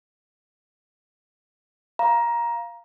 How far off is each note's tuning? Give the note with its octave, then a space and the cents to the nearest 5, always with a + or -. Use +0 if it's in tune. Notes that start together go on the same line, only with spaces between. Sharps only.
F5 +0 A#5 +15